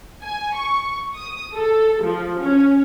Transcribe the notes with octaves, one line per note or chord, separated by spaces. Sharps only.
G#5
C#6
D#6
A4
F3
C#4